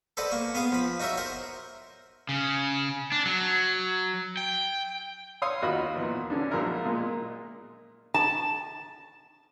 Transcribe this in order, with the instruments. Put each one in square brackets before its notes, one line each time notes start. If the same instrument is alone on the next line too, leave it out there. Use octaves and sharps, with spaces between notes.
[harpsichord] A4 B4 C5 D5 D#5 F#5
A#3 C#6
B3 G#4 F5 D#6
F3 B5
D#4 F#4 A#4 C#5 E5
A#4 C5 F#5
[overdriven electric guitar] C#3
D4
F#3
G5
[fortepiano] C#5 F5 C6 D#6
D#2 F4 F#4 D#5 B5 F#6
E2 A#2
D3 C#4 D4
A#1 F#3 G#3 E4 A#4 E5
A#2 G#3 A#3
[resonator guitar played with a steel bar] A5